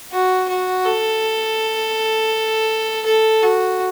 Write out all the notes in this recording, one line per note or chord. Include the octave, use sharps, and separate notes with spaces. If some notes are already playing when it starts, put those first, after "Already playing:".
F#4
F#4
A4
A4
F#4